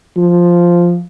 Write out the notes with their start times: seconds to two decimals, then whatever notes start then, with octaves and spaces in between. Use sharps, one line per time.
0.17 F3